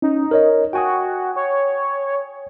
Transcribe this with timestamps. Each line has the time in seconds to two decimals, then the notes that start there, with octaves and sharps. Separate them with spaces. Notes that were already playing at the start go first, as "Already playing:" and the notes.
0.02 C#4 D#4
0.31 A#4 C#5 D#5
0.73 F#4 G5 G#5 D#6
1.36 C#5